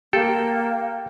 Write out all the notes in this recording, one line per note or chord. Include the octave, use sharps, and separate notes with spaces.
A#3 G4 A4 G5